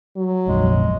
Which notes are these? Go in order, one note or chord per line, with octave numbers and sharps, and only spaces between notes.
F#3
F1 A#1 F2 G#3